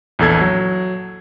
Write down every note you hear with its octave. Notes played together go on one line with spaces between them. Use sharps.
A#1 E2 A4 G#6
F#3